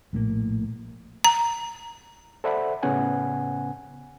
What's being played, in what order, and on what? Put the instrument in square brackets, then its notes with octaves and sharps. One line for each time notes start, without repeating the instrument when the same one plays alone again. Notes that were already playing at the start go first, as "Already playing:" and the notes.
[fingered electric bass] A#1 A2 D#3 A#3
[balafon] A#5
[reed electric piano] A4 C5 D5 E5 F#5 B5
A2 C#3 B3 C#4 F#5 G#5